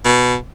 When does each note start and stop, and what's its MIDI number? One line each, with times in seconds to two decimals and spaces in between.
0.05 0.36 47